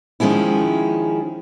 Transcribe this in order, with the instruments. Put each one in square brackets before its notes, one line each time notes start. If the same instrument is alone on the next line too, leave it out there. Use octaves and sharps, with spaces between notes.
[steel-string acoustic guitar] D#3 F3 G#3 C#4 E4